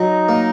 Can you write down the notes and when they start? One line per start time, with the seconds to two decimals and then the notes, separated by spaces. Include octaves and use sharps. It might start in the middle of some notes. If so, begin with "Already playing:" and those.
Already playing: F#3 D#4
0.29 A#3